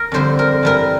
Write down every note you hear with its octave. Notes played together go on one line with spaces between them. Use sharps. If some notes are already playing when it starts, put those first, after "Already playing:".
Already playing: A#4
F2 D3 G3 C5
A#4
G2 E3 G3 A#4